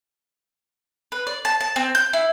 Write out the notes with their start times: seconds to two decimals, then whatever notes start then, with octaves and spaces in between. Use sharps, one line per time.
1.12 B4
1.27 D5
1.45 A5
1.61 A5
1.76 C4
1.95 G6
2.13 E4